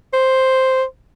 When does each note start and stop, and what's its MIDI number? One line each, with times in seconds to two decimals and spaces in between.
0.13 0.83 72